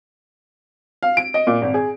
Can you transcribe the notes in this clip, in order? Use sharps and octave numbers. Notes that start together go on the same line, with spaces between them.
F5
D7
D#5
A#2
G#1
G#4